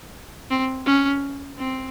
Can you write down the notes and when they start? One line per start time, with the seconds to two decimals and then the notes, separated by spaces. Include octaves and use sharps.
0.51 C4
0.86 C#4
1.58 C4